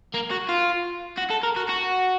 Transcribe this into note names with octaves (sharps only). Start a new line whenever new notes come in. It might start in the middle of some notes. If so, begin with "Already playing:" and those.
A#3
F#4
F4
F#4
A4
A#4
F#4
F#4